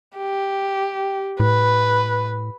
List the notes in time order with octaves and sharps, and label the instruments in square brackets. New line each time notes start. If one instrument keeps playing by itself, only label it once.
[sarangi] G4
[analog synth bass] A2 [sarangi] B4